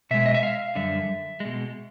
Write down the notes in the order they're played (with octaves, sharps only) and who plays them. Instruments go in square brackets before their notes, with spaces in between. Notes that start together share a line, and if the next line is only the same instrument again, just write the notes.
[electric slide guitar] B2 G#3 E5
D#5
E5
F5
F#2 D3 G3 E5
B2 G#3